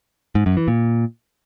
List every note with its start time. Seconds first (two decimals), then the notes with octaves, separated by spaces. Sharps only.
0.35 G#2
0.46 F#2
0.57 E3
0.68 A#2